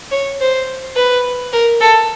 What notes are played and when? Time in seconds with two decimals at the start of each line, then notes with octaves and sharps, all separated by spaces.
0.11 C#5
0.40 C5
0.97 B4
1.53 A#4
1.81 A4